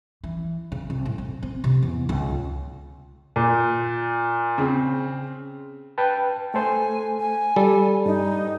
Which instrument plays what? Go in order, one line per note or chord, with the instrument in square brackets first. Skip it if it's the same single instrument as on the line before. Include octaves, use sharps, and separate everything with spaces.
[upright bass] E3
C#3
C2
A2
F2
C4
C3
E2
C#2
[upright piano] A#2
C#3 C4
[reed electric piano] B4 G5 A5
[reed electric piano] A3 A4 C5 [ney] G#5
[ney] G#5
[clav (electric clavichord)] G3 [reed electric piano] A4
[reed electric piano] G2 [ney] D#4